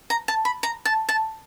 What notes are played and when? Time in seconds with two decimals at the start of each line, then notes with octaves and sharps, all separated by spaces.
0.10 A#5
0.28 A5
0.45 B5
0.63 A#5
0.85 A5
1.09 A5